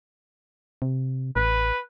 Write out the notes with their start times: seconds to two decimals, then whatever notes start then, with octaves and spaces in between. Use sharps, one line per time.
0.82 C3
1.36 A1 B4